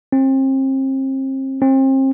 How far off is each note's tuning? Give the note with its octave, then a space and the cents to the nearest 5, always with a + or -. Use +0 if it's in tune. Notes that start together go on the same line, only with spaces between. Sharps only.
C4 +35
C4 +35